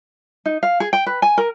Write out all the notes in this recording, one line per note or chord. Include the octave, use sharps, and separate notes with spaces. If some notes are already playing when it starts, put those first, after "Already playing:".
D#4
F5
G#4
G5
B4
G#5
A#4